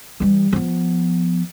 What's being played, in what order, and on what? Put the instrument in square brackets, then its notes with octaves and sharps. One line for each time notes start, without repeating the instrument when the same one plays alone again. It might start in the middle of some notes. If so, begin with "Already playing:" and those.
[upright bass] E3 G3
F3 B3